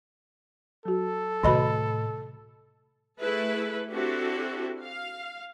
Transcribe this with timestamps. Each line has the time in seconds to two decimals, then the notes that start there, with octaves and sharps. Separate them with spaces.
0.85 F#3 F#4 A4
1.43 A2 C3 D#3 A3 F#4 D#5 B5
3.20 A3 E4 G#4 A4 B4
3.92 C4 D4 E4 F#4 G4 A4
4.83 F5